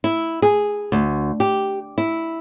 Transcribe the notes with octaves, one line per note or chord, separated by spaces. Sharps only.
E4
G#4
D2
G4
E4